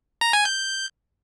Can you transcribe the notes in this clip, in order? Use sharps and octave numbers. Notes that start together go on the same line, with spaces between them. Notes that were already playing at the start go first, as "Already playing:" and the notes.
A#5
G#5
G6